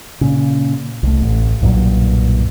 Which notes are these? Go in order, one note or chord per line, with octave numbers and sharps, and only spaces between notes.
A#2 C#3
C2 A3
A1
B1 G2 A#2 F#3